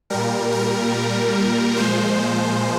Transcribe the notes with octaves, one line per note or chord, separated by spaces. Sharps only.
A#2 G3 A#4
A#4
A#2 F3 G#3 C5